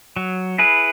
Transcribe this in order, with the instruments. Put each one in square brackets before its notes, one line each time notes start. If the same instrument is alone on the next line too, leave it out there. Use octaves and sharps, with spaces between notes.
[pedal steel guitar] F#3
E4 G#4 B4